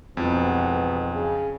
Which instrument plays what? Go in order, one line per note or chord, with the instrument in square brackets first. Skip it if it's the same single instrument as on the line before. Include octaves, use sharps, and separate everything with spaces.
[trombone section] B1 G#2 B3 [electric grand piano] F2 [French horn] E3
[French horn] C#3